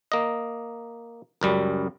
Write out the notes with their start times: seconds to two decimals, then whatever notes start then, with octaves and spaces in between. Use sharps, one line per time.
0.12 A#3 D#5
1.41 C#2 F#2 G3